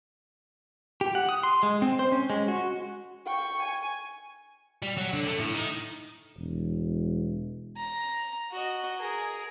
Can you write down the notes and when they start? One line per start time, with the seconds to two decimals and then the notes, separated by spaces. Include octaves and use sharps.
1.01 G4
1.15 F#5
1.29 D#6
1.43 C6
1.63 G#3
1.82 C4
1.99 C5
2.12 C#4
2.30 G#3
2.48 F#4
3.26 G5 C#6
3.63 G#5
4.82 G3
4.97 F#3
5.13 D3
5.27 A3
5.40 A2
5.54 D#3
6.38 E1
7.77 A#5
8.51 F#4 D#5
8.98 G#4 A#4